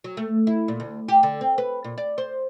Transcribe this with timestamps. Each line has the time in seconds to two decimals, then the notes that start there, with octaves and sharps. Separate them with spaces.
0.04 F#3
0.17 A3
0.47 E4
0.68 A#2
0.80 D2
1.08 G4
1.23 D3
1.41 C4
1.58 B4
1.84 A#2
1.98 D5
2.18 C5